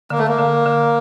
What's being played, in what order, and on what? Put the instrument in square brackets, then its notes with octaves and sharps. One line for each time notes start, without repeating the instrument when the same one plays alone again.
[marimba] D3 [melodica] A#3
[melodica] A3
A#3
[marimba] D3
D3